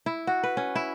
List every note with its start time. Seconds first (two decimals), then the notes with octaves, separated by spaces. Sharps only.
0.06 E4
0.27 F#4
0.43 B4
0.57 C#4
0.75 E4